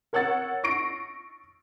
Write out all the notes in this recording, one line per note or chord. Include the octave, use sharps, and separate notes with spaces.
A#4 C#5 F#5 E6 A6
C#6 A#6 C7 D7